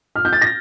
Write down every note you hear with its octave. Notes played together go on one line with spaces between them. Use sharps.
F6
G6
A6
A#6